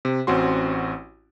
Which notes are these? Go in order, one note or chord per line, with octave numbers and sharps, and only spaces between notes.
C3
A1 C4 C#4 F#4 C6